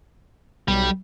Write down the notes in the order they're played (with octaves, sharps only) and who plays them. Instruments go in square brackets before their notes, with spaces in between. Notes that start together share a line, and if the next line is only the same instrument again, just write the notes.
[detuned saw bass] B1 [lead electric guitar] G3